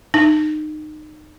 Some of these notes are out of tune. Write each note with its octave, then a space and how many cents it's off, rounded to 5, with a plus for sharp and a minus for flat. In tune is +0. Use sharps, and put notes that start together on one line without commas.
D#4 -25